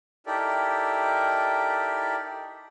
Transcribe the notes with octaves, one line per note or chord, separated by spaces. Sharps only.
D#4 E4 G4 A4 A#4 D5